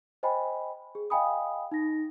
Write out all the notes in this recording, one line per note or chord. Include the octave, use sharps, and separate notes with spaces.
C5 D#5 G5 G#5 B5
G#4
D#5 F5 G5 G#5 B5 D#6
D#4 A#6